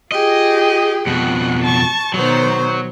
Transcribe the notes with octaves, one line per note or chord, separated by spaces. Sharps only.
F4 G4 G#4 D#5
F2 B2 F#5
A5 C#6
B2 D#3 F#3 C5